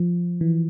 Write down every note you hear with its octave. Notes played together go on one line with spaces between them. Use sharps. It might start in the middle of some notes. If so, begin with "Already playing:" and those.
Already playing: F3
E3